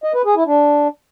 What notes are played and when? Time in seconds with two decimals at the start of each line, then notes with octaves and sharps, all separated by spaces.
0.04 D#5
0.14 B4
0.25 G#4
0.36 E4
0.47 D4